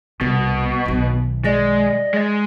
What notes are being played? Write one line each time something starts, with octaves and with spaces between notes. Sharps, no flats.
C2 B2
B1 D#3
G#3 D5 D#5
G#3